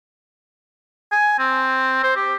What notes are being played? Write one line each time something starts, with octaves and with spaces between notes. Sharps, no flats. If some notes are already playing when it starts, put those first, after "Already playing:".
G#5
C4
C5
G4